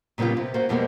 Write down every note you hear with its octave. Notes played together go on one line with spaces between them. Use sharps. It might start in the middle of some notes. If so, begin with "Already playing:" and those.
A#2 C#3 G3 B3 F4
C3
A#3 F4 F#4 C5
F2 B2 G3 G#3 A#3 B3